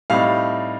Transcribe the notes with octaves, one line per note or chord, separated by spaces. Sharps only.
A2 G3 C4 D#4 F5